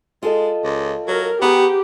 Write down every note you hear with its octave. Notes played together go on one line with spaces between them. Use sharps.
G#3 F4 A4 D#5
C#2
F#3 A#4
B3 G4 G#4 F#5 A#5